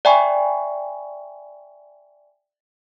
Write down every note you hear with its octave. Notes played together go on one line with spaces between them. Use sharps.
D5 E5 G5 G#5 B5 C#6